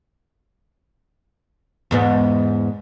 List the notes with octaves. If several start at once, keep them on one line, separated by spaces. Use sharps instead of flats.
E2 G#2 B3